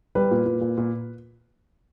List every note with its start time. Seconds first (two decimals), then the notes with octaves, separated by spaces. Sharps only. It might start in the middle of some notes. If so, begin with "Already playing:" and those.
0.15 G3 B4
0.31 A#2
0.46 A#2
0.61 A#2
0.78 A#2